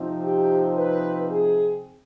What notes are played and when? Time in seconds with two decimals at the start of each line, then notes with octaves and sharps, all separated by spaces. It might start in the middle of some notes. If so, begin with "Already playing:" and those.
Already playing: C3 F3 C4 D#4
0.22 G4
0.76 B4
1.30 G#4